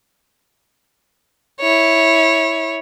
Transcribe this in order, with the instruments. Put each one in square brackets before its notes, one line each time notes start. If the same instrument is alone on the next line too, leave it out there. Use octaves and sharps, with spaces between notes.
[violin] E4 C#5